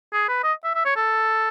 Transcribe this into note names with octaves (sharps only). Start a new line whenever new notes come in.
G#4
B4
D#5
E5
E5
C#5
A4